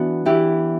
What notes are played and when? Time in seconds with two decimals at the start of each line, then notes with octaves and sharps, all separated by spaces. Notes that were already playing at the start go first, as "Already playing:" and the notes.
Already playing: E3 B3 D4 F#4
0.25 E3 E4 G4